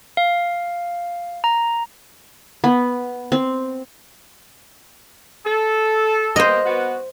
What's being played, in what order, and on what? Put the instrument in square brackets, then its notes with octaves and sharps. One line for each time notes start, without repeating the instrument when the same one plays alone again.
[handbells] F5
A#5
[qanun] B3
C4
[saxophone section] A4
[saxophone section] A#3 B3 G4 [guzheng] C5 D#5
[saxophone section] B3 F#4